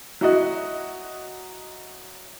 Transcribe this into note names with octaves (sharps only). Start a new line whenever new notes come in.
F#3 E4 F#4 D#5